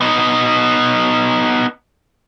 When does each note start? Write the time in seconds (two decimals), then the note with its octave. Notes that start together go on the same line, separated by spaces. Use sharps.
0.01 B3 D#4